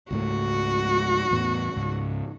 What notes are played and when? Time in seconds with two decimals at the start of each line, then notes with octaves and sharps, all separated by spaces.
0.11 C#2 G#2 A3 F#4
1.31 E2 A2 B3
1.76 C#2 G#2